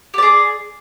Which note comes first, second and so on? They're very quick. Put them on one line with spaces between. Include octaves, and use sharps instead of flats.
G4 D5 G#4